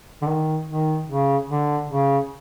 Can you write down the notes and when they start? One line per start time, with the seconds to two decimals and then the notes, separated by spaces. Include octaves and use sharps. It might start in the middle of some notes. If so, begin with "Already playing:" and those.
0.22 D3
0.27 D#3
0.68 D#3
1.08 C#3
1.49 D3
1.89 C#3